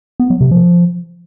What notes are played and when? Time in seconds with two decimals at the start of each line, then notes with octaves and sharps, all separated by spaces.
0.20 B3
0.30 F#3
0.41 C3
0.51 F3